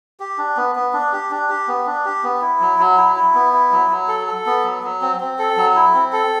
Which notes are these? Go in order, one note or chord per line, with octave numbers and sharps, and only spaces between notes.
G4
D4
B3
B3
D4
G4
D4
G4
B3
D4
G4
B3
E4
F#3
F#3
E4
E4
B3
E4
F#3
F#3
A4
A4
B3
F#3
F#3
C4
C4
A4
F#3
E4
C4
A4